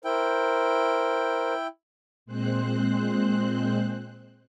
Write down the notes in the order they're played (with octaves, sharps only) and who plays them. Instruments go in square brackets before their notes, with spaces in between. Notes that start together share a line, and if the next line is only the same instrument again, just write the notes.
[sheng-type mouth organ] E4 G5 [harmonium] A#4 C5
[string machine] A#2 G#3 C4 C5 F#6